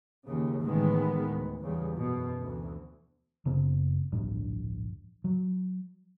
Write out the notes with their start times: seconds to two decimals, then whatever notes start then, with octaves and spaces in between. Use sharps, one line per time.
0.25 D#2 C#3
0.61 A1 A2 D#3 E3 G#3 B3
1.25 D2
1.62 E2 C#3 G3
1.94 F#2 B2
2.42 D2 E3
3.45 F#1 C#3 B3
4.12 D1 A#1 G2
5.24 F#3